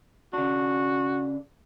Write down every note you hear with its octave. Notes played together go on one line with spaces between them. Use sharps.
C#3 D4 F#4